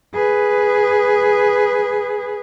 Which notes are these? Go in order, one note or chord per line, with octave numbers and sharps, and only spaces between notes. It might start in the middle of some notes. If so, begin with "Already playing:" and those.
G#4 B4